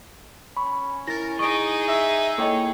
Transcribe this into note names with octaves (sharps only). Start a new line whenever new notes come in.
C#4 B5 C#6
E4 A#4 A6 A#6
D#4 G#4 D#5 C#6 D7
E5
A#3 E4 A4 C#5 D#5 G5